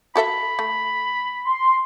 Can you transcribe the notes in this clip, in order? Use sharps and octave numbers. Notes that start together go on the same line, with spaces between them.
F#4 A4 E5 B5
A3
C6